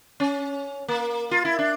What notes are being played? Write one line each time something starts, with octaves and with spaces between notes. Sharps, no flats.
C#4
A#3
F4
E4
D4